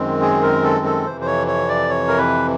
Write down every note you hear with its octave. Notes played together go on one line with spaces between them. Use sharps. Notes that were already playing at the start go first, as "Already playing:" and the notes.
Already playing: F#2 D#3 G#3 C4
G#4
A#4
A4
A4
F2 C3 E3 C5
C5
C#5
C#5
D5
C#5
A#4
B4